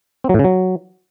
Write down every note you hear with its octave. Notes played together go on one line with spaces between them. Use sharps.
C4
F#3
A2
C#3
F#3